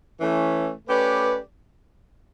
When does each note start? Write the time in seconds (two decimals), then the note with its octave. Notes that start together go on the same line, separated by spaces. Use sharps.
0.21 E3 A3 C#4
0.88 A3 C#4 G4 B4 D5